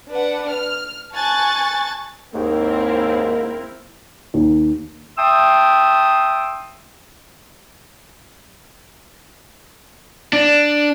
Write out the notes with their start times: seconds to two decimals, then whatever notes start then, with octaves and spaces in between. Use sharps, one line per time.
0.11 D4 B4 F#5
0.49 F6
1.15 G#5 A5 C#6 F#6 A6
2.34 D#2 G#2 A#3 C4 E4 A#4
4.34 D#2
5.18 E5 G5 A5 C6 D#6 E6
10.33 D4